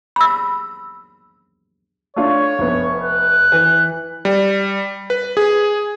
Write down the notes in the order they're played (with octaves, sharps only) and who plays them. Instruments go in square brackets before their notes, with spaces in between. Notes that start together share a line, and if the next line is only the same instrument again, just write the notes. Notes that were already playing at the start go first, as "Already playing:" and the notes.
[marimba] B5 E6
[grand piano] A3 D4 F4 [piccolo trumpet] C#5
[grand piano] F1 B3
[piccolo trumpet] F#6
[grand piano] E3 B4
[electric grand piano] G3
B4
G#4